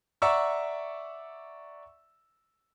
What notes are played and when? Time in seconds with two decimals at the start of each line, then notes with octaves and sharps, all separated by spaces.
0.22 D5 E5 F#5 A#5 C#6 E6